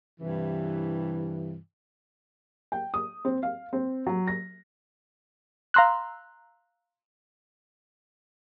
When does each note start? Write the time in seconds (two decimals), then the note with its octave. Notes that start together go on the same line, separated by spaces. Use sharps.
0.21 G2 C3 E3
2.72 G5
2.94 D#6
3.25 C4
3.43 F5
3.73 C4
4.07 F#3
4.28 A#6
5.74 F5 A#5 C6 E6 F#6